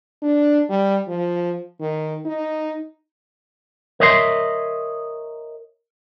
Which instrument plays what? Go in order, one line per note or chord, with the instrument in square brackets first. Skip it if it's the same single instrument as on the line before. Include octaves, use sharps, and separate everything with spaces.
[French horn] D4
G3
F3
D#3
D#4
[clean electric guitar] A#4 C#5 D#5 E5 F#5 C6